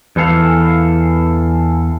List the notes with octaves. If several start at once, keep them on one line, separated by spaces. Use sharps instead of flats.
E2 E3 A4 F5